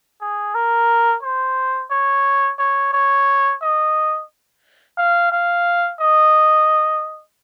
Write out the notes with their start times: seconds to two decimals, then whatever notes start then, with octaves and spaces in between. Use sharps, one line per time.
0.21 G#4
0.55 A#4
1.23 C5
1.91 C#5
2.59 C#5
2.93 C#5
3.62 D#5
4.98 F5
5.32 F5
6.00 D#5